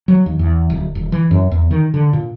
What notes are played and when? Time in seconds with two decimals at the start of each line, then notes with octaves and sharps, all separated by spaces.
0.08 F#3
0.26 D#2
0.39 E2
0.70 D1
0.95 D#1
1.12 E3
1.31 F#2
1.51 E2
1.71 D#3
1.94 D3
2.13 A#2